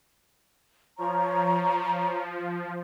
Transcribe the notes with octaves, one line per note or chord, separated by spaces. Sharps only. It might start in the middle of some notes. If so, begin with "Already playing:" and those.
F3 C#5 A#5 C#6